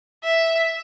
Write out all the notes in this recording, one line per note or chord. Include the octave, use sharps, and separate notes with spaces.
E5